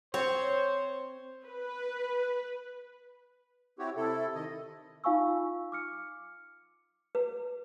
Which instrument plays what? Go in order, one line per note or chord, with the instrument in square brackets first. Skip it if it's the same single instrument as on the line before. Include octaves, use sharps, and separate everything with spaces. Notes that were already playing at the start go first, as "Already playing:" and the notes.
[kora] C4 [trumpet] C5 [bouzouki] C#5
[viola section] B4
[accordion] C4 E4 F#4 G4 C#5
C3 E4 A4
D#3 D#5
[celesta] D#4 F4 F5 G#5 C#6 E6
D6 F6 C#7
[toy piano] B4